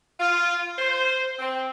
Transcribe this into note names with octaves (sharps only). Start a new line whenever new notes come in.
F4
C5
C4